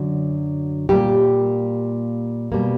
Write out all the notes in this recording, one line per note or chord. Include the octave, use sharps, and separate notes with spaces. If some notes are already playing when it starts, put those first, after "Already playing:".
Already playing: F#2 D3 F#3
A#2 G3 A#3 G4
B2 G3 A#3